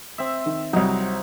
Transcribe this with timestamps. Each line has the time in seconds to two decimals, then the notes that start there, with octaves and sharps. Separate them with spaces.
0.18 C4 E5
0.46 D#3
0.73 C2 F#3 D#4